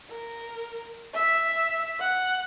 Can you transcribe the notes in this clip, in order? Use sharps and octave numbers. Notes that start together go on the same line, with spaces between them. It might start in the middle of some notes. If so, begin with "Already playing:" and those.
A#4
E5
F#5